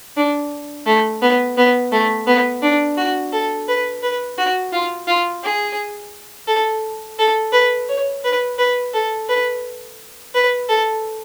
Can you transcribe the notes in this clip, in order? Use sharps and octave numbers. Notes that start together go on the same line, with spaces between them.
D4
A3
B3
B3
A3
B3
D4
F#4
A4
B4
B4
F#4
F4
F4
G#4
A4
A4
B4
C#5
B4
B4
A4
B4
B4
A4